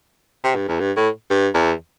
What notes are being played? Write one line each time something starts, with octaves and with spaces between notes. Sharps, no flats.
C3
G2
E2
G2
A2
G2
E2